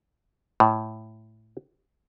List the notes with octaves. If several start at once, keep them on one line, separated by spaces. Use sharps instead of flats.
A2